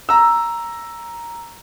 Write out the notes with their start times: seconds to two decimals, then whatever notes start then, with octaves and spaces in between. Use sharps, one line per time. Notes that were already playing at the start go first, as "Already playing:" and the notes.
0.09 A#5 E6